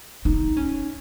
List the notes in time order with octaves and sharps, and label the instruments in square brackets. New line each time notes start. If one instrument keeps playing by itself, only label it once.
[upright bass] D#4
C#4